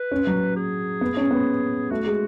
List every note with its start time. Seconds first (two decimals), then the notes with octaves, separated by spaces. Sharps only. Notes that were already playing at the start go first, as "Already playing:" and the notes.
Already playing: B4
0.11 C#4
0.27 F#3
0.56 G#4
1.01 B3
1.17 C#4
1.31 B3
1.91 A3 F#4
2.06 G#3